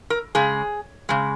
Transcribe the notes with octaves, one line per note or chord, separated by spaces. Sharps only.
A#4
C#3 G#3 G#4
C#3 G#3